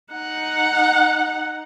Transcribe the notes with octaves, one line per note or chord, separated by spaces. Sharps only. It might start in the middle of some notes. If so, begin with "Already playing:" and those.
D#4 F#5